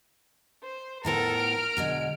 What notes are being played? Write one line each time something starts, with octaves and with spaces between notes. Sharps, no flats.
C5
A2 F3 B3 A4 A#4
F6 D7
B2 D3 G#3